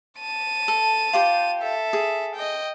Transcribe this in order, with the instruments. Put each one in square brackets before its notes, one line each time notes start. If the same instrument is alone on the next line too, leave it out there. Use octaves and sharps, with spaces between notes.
[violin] A5 D#7
[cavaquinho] A4
F4 G4 C5
[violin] A4 E5
[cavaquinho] G#4
[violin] D#5 G5